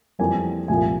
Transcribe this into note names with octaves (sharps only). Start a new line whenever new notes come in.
F2 E3 G3 A#3 G#5
C2 A#2 F3 G#5